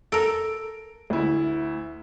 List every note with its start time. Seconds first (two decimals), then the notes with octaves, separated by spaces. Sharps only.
0.12 A4 A#4 D7
1.10 D2 E4